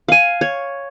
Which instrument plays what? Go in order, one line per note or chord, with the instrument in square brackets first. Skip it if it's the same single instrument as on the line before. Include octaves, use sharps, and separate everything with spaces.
[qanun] F5 G#5
C#5